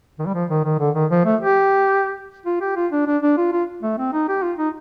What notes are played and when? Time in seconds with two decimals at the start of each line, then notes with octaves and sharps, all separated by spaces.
0.19 D#3
0.27 G3
0.34 F3
0.50 D#3
0.64 D#3
0.79 D3
0.95 D#3
1.11 F3
1.25 A3
1.41 G4
2.46 F4
2.61 G4
2.76 F4
2.92 D4
3.07 D4
3.22 D4
3.37 F4
3.52 F4
3.83 A3
3.98 C4
4.13 D#4
4.29 G4
4.43 F4
4.58 D#4